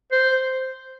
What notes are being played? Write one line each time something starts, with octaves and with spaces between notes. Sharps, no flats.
C5